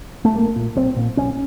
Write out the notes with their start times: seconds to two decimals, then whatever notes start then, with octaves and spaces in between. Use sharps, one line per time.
0.25 A3
0.35 B1 A#3
0.56 A#2
0.76 B1 C4
0.96 A#2
1.17 B1 C#4